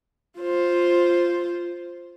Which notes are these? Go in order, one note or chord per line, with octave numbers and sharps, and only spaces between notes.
F4 C5